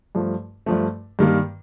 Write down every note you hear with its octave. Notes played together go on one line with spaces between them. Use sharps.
G2 F3 A3
G2 F3 A3
G2 D#3 G3 A#3